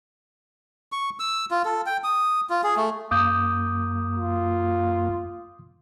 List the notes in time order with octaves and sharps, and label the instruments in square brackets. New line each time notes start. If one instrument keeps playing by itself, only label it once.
[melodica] C#6
E6
F4
A4
G5
D#6
F4
G#4
A3
[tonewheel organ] F#2 A#3 [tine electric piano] D6 D#6 G6
[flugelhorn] F4